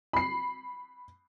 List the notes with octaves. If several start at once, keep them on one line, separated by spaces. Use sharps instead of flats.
B5 C7